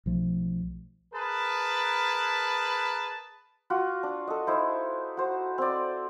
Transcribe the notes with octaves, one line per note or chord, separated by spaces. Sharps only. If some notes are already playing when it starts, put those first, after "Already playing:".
B1 F3 A3
G#4 A#4 B4 A5 B5
F4 F#4
D4
A4 D#5
D#4 E4 C5
F#4 C5
C4 D5